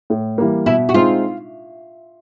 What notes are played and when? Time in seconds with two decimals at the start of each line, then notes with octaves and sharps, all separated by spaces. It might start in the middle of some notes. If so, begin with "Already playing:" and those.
0.10 A2
0.38 E3 G3 A#3
0.66 B2 E4
0.89 F#4
0.94 G#3 C4 D#4 F4